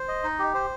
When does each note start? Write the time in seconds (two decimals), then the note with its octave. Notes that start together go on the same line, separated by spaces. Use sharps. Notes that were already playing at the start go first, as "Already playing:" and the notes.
Already playing: C5
0.08 D#5
0.24 D#4
0.39 G4
0.54 C5